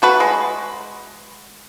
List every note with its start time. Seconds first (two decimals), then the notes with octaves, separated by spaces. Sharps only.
0.02 A3 F#4 B4
0.20 G#3